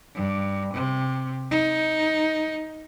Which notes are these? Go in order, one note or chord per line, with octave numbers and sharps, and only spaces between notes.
G2
C3
D#4